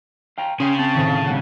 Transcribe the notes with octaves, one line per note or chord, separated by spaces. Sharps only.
F5 G5 A#5
C#3 C#4 G5 C6 D#6
C4 A5
A2 C3 D#3
B2 G3 C4 F#5